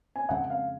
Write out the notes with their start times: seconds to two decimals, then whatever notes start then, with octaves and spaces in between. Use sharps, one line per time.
0.16 G#5
0.29 F2 C#3 G#3 C4 F#5
0.50 F5